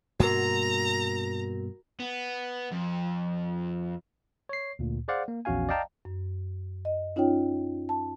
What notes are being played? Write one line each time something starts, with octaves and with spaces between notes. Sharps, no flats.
G2 B2 A#3 F#4 A#4 A#5
B3
F2
C#5 C7
D2 A#2
G#4 C5 D5 F5 F#5
A#3
A#1 E2 C#4 F#4 F5 G#5
D5 D#5 F5 G5 A5 A#5
F#2
D#5
C#4 D#4 F4 C#5 G5
A5